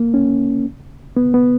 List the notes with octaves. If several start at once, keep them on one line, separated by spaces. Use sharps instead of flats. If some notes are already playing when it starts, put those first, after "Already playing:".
Already playing: A#3
C#4
B3
B3